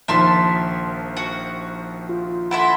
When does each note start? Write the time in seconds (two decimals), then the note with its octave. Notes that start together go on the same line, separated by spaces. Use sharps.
0.08 A#1 D#3 F3 E5 A5 C6
1.17 F#4
2.09 F4
2.51 E4 A4 E5 F#5 C6